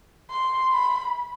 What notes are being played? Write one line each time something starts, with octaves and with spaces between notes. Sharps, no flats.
C6
B5